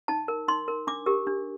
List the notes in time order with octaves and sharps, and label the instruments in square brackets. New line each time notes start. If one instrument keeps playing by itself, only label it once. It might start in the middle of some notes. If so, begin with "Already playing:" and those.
[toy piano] D#4 A5
A#4
D#4 C6
A#4
D4 D6
G4 A#4
D4